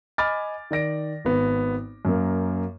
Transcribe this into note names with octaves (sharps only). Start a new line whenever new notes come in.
D#5 G#5 B5 D6 F6 A6
D#3 D5 A#6 D7
G#1 B3
F#2 A#3